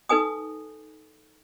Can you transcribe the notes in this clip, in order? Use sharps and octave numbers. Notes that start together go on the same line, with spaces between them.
D#4 A4 B4 G#5 D#6